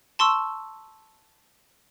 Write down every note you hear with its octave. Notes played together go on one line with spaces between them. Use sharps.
A5 C6 C#6 E6